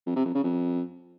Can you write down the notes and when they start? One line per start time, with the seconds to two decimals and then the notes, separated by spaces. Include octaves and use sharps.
0.06 F2
0.16 C3
0.25 F2
0.34 C#3
0.44 F2